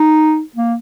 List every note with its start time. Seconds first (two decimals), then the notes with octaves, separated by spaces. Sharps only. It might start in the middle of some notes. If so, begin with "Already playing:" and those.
Already playing: D#4
0.56 A#3